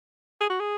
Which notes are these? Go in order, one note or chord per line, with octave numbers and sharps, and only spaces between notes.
G#4
F#4
G#4